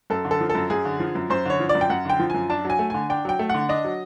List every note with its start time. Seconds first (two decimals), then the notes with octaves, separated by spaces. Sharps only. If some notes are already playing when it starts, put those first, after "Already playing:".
0.10 F#2 A4
0.25 D3
0.31 A4
0.40 F3
0.50 A4
0.55 F#2
0.70 F#2 G#4
0.85 D3
1.00 F3
1.15 F#2
1.30 F#2 C5
1.45 D3 C#5
1.60 F3
1.69 D5
1.75 F#2
1.81 G5
1.90 F#2 F#5
2.05 D3 G5
2.20 F3
2.30 F#2 G#5
2.50 D4 A5
2.65 F#3 G#5
2.79 A3
2.90 D3 G#5
3.10 D4 G5
3.25 F#3 G5
3.39 A3
3.50 D3 F#5
3.69 D4 D#5
3.84 F#3